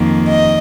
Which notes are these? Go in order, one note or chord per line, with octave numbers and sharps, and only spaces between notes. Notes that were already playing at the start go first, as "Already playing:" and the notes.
Already playing: F2 D#3 A#3
D#5